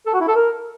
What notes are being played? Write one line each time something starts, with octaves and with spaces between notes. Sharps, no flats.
A4
F#4
E4
A4
A#4